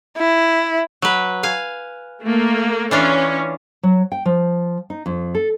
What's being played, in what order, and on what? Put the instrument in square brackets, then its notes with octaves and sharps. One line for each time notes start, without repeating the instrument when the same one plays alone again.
[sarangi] E4
[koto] F#3 B4
F5 G#5
[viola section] A3 A#3
[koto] E3 D4 F4 [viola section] C#4
[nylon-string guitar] F#3
G5
F3
D#4
F2
A4